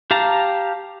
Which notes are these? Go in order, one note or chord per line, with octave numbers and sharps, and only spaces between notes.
G4 F5 A5 A#5